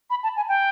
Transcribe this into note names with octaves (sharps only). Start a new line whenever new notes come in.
B5
A5
G#5
G5